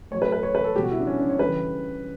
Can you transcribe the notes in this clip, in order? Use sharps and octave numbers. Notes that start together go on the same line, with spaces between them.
A2 F#3 C#5
B4
B4
C#5
B4
A4
B2 G3 G4
F#4
E4
D4
C#4
D4
C#5
C#3 E3 G3 B4